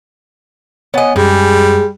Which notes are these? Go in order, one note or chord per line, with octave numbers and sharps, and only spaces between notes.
B3 C#5 D#5 F#5 G#5
F#2 G3 G#3